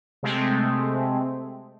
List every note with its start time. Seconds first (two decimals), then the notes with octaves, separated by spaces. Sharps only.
0.23 C3 G#3 A3 C4